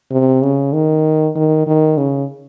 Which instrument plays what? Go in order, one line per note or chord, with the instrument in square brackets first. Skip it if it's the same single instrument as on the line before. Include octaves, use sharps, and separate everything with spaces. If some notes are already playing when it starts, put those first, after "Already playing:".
[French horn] C3
C#3
D#3
D#3
D#3
C#3